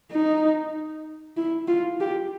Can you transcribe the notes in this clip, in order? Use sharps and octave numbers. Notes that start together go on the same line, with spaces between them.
D#4
E4
F4
G4